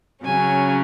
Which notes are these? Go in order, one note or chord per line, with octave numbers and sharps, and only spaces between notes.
C#3 F#3 C#4 G#5